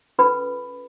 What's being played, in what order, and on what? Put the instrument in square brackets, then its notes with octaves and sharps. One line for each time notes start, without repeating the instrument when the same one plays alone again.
[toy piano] C#4 F4 A4 B4 B5